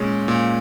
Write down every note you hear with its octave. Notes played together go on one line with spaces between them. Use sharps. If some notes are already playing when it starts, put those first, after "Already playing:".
Already playing: A#2 G#3 C#4
A#2